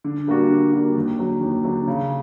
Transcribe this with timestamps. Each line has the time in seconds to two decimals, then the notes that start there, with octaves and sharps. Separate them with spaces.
0.04 D3
0.27 G3 A#3 D4 F#4
0.50 D3
0.73 G3 A#3 D4 F#4
0.96 D#2
1.19 D3 F#3
1.41 D#2
1.64 D3 F#3
1.88 C#3